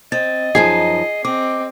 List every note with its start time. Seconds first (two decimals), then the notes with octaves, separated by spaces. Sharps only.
0.12 C4 D#5 A6
0.55 F#2 F3 D#4 G#4 C7
1.25 C4 D#5 D6